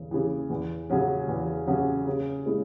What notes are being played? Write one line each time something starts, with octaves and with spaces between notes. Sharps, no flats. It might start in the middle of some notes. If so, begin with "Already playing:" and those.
Already playing: E2 C#3
C#3 E3
E2
C#3 F#3 C#4
E2
C#3 F#3 C#4
C#3
G#3 C#4 E4